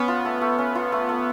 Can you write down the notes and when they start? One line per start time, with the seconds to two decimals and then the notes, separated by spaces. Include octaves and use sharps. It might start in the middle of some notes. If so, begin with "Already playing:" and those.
Already playing: B3 C#4 B4 D#5
0.08 F4
0.25 A3
0.41 A3
0.58 C#4
0.75 F4
0.92 A3
1.09 A3